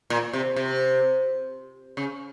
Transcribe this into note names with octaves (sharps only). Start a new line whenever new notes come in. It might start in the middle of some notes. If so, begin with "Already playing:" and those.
A#2
C3
C3
C#3